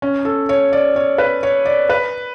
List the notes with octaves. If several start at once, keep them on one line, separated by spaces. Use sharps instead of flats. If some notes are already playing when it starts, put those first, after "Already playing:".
C#4
A4
C#5
D5
C#5
B4
C#5
D5
B4